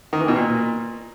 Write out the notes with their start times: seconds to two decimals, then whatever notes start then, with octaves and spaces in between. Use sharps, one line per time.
0.13 D#3
0.20 E3
0.28 B2
0.36 A#2